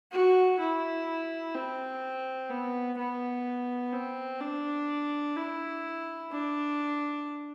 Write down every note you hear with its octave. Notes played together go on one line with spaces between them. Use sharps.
F#4
E4
C4
B3
B3
C4
D4
E4
D4